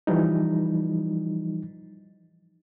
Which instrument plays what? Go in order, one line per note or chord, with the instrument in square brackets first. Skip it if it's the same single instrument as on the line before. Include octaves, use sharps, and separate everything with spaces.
[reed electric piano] E3 F3 G3 D#4